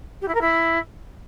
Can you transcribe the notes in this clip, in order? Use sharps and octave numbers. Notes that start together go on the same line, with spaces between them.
G4
E4
A#4
E4